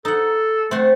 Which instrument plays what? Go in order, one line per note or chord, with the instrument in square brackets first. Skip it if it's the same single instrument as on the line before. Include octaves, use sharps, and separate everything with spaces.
[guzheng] D#4 F#5 [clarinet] A4
[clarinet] A3 [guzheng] C4 F#5 C6